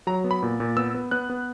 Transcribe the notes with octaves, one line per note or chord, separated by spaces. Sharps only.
F#3 A#5
B3
B5
A#2
A#2
B3 E6
B3
B3 F#6
B3